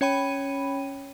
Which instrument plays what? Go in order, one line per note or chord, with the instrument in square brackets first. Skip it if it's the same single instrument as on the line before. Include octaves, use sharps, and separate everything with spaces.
[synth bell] C#4 C#5 G5 B5 D#7